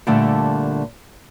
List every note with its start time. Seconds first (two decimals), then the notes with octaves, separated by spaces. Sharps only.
0.07 A#2 D3 G3 A3